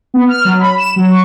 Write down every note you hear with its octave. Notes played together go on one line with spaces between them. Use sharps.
B3
F6
F#3
B5
E7
F#3
C#6